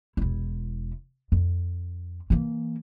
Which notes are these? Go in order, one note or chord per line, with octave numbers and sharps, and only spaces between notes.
E1 E4
F2
E3 A#3